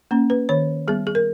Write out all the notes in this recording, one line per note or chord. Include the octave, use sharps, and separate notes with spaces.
A#3 C#4
B4
D#3 C#5
G3 B3 G#4
G#4
A#4